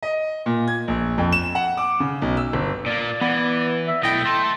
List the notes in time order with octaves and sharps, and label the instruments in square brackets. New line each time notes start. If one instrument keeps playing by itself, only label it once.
[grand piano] D#5
A#2
G#6
A#1
F2
E7
F#5
D6
C#3
B1
E6
G1
[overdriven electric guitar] A#2 A#3 [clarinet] D5
[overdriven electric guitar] E3 [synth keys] B3 [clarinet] D5
[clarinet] E5
[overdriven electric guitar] B1 A3 [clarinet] E4 [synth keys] D#5 G5
[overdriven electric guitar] A3 A4 [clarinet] C6